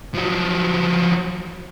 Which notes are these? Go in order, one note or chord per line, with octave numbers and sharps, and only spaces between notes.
F3 F#3